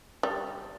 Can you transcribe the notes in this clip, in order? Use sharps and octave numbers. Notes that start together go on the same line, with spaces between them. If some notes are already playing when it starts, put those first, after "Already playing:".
G3